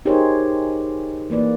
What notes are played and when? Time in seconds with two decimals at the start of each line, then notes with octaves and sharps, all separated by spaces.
0.05 D#4 G4 G#4 A#4 C5 C#5
1.30 E3 A#3 B4 D5